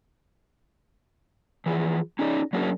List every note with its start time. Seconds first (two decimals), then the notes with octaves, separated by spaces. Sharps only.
1.66 E3 F3 G#4
2.19 C#4 D#4 G#4 C#5 D5
2.53 F#3 A#3 C#4 D4 G#4 A#4